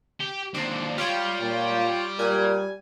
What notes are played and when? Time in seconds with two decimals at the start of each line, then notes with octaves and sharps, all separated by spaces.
0.20 G4
0.55 D#2 C4 D4
0.98 F4 G4 C#5 D5 G5
1.40 A#2
2.19 A#2 G3 G#5